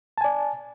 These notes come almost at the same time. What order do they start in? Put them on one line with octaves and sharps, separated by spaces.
A5 G#5 D5